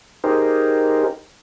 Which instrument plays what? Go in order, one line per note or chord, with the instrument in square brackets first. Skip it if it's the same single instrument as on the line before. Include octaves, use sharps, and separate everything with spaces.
[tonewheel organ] D#4 G4 G#4 A#4 C5